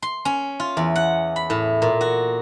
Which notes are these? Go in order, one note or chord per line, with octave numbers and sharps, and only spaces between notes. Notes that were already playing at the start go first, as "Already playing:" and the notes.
C6
C#4
F4
E2
F#5
B5
A2
A#2
F#4